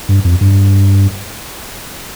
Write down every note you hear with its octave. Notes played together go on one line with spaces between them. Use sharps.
G2
F2
G2